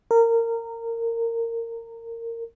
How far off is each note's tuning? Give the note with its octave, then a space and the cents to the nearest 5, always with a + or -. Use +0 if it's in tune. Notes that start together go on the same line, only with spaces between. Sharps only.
A#4 -20